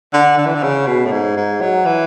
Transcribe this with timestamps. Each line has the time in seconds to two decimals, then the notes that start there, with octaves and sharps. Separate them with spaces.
0.13 D3
0.38 D3
0.46 E3
0.55 D3
0.63 C#3
0.87 B2
1.05 A2
1.12 G#2
1.36 G#2
1.61 F#3
1.86 E3